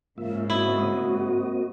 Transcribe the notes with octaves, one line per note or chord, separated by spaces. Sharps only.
G#2 C#3 A#3 F4 E5
A#3 C4 E4 F#4 D#5